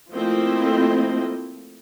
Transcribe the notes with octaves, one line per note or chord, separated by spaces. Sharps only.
F3 A3 A#3 C4 E4 D#5